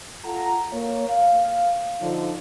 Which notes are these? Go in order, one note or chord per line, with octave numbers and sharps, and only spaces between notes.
F4 A4 F#5 A#5
A#3 C#5
F5
D3 F3 D#4